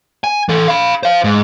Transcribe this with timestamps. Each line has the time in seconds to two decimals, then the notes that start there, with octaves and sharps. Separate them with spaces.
0.24 G#5
0.49 E3 A4
0.68 F5 B5
1.03 C5 F5
1.24 G#2